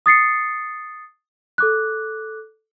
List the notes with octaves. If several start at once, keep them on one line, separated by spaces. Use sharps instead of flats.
D#6 A6 C7 C#7
A4 D6 F#6